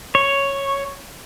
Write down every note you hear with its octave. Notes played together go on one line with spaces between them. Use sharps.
C#5